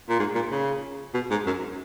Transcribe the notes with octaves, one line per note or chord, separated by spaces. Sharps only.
A#2
G#2
A#2
C#3
B2
G#2
F#2